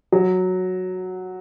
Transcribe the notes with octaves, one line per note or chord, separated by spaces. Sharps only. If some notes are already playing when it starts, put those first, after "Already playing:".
F#3